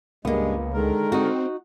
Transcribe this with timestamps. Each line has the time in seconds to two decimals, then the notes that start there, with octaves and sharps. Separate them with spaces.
0.25 C#2 G2 G#3 A#3 B3
0.73 D3 D#3 G#3 A#4
1.12 C4 D#4 F#4